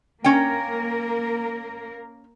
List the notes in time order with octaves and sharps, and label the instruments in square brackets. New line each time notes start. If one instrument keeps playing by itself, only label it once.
[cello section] A#3 A#4 [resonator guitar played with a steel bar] C#4 G5